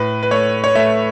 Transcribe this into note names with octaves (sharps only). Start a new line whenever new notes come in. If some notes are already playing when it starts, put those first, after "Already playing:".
Already playing: A2 B4
B4
A3 C#5
C#5
A3 E5